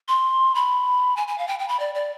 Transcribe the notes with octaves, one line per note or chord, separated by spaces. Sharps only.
C6
B5
G#5
G#5
F5
G5
G5
B5
D5
D5